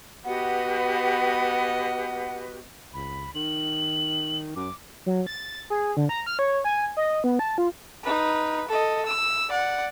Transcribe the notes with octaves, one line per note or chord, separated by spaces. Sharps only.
B3 F#4 G4 B4 D#5 F#5
C#2 B5
D#3 F#7
F#2 D6
F#3
A6
G#4
D3
A#5
F6
C#5
G#5
D#5
B3
A5
F4
D#4 B4
A4 D#5
E6
D5 F#5